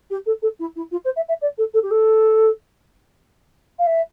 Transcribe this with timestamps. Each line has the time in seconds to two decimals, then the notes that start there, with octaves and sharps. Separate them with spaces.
0.10 G4
0.26 A4
0.42 A4
0.59 E4
0.76 E4
0.91 F4
1.05 C5
1.16 E5
1.28 E5
1.41 D5
1.58 A4
1.74 A4
1.83 G4
1.91 A4
3.79 F5
3.86 E5